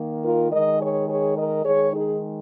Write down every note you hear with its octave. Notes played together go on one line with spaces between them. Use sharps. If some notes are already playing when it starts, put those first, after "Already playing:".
Already playing: D#3 A#3
F4 A#4
D#3 G#3 A#4 D#5
G#4 C#5
G#4 C#5
A#4 D#5
D#3 G#3 G#4 C#5
D#4 G#4